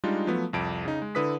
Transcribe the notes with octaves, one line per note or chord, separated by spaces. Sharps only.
G3 G#3 D4 D#4 F4
F3 F#3 A3 B3
C2 F2 D7
C#3 D#4
G#3
D3 E4 B4 D#6 B6